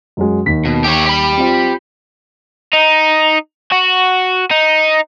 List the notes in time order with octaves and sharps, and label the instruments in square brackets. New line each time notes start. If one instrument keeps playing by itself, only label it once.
[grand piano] F#2 F#3 G#3
D#2 B6
[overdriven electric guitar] B2
G4 C#5
G4 B5
[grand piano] C4 F4
[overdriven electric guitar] D#4
F#4
D#4